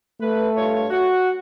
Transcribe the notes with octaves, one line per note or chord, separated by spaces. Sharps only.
A3 B4
G2 F4 C#5
F#4